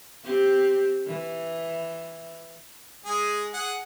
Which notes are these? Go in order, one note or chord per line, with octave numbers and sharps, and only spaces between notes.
C4 G4
E3
G#3 G#4
G#4 F#5